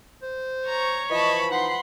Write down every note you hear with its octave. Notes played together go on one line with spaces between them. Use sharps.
C5
C#5 A#5 C#6
E3 F3 D#5 A5 B5
D#4 F#5 B5 C6